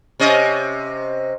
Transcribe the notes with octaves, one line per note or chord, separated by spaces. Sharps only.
C3 C#4 D#5